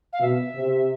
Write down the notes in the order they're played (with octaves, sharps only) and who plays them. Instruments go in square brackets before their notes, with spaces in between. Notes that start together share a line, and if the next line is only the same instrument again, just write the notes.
[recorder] F5
[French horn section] B2 [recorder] E5
[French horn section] C3